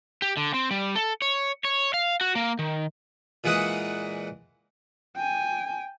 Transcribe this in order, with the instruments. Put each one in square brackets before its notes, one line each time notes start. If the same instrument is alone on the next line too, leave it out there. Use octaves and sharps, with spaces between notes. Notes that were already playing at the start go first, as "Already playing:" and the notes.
[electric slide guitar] G4
D3
C4
G3
A4
C#5
C#5
F5
F#4
A#3
D#3
[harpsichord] A#2 E3 G#3 F#5 D#6
[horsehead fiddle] G5 G#5